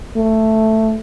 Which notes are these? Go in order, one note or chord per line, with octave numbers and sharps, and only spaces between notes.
A3